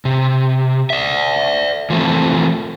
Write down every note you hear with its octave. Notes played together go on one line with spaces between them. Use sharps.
C3
D5 E5
E3 F3 A3 C4